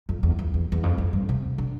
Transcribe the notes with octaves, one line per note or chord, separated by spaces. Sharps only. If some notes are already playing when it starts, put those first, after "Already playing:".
F2
E2
F2
E2
E2
F2
F2
G2
C3
D3